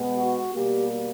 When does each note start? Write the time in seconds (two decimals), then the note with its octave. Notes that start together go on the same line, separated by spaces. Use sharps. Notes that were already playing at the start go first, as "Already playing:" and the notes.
Already playing: B2 G#3 B3
0.16 F#4
0.53 B2 G3 A#3 G4